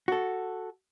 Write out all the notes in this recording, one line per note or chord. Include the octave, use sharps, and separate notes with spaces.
F#4 A4